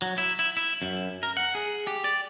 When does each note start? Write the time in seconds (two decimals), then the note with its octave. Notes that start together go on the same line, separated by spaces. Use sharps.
0.02 F#3
0.18 E4
0.39 E4
0.57 E4
0.82 F#2
1.23 A#4
1.37 F#5
1.55 G#4
1.87 G4
2.04 D5